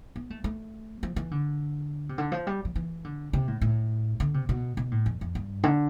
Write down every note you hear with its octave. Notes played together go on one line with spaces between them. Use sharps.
B3
A3
A3
F3
E3
D3
C3
D3
F3
G3
F3
E3
D3
C3
A2
A2
D3
C3
B2
B2
A2
F2
F2
G2
D3